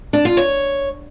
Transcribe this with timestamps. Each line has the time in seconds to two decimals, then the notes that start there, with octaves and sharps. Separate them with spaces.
0.13 D4
0.25 F4
0.37 C#5